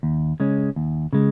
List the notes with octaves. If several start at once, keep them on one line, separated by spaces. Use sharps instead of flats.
D#2
C#3 G#3 C#4
D#2
C#3 G#3